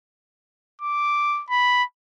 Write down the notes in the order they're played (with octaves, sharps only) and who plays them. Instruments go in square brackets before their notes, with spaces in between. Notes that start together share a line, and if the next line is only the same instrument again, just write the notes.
[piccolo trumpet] D6
B5